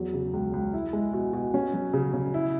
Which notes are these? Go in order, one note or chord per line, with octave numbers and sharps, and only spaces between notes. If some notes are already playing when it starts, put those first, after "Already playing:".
Already playing: E2 F#3
C#3
C#2
C#2
E4
G#3
B2
B2
C#4
F#3
C#3
C#3
E4